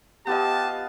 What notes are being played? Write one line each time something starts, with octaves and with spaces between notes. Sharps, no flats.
B3 F4 G4 D#5 A5